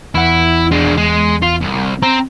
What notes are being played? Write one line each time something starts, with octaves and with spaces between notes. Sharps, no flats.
E2 E4 F#5
G#3 D4
G#3
F4
C2
C4 A#5